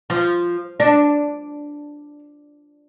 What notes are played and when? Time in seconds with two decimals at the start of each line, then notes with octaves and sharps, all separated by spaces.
0.10 F3
0.80 D4